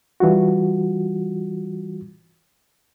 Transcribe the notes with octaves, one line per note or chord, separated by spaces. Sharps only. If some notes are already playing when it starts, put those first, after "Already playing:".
E3 G3 F4 F#4